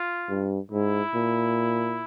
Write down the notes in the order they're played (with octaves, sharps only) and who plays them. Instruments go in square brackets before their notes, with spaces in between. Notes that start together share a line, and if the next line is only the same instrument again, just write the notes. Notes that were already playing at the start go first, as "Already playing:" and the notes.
Already playing: [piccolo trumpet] F4
[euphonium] G2
[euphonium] G#2 [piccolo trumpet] E4
[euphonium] A#2